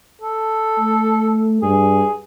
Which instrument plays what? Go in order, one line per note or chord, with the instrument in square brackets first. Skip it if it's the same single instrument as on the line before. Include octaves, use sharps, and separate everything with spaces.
[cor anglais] A4
[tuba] A3
[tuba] G2 [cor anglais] G#4